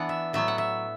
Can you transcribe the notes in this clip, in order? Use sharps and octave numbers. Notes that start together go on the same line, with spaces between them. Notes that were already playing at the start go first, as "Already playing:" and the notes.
Already playing: E3 B3 D4 F#5
E5
A2 F#3 B3 E5
F#5
E5